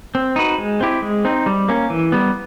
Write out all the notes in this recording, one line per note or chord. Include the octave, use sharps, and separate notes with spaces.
C4
D#4 F#4 B4
G#3
C4 E4 G4
G#3
C4 D#4
G3
A#3 C#4
E3
G3 B3